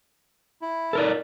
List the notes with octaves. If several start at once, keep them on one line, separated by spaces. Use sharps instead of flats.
E4
A4 A#4 D5